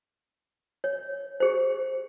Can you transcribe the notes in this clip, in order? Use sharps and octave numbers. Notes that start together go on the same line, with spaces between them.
C#5
G4 G#4 C5